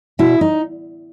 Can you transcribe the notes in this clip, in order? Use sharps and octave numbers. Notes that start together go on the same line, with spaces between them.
B2 E4
D#4